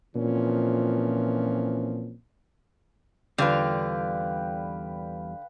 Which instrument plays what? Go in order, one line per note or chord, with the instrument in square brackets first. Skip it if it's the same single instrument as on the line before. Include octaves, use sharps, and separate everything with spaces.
[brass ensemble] A#2 E3 F3 C4 C#4
[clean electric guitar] E2 G3 [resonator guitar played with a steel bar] D3 F4 [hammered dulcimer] B4 F5 G5